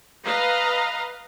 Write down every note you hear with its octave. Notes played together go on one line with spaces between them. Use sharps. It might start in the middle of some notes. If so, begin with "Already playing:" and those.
B4 D#5 F5 A#5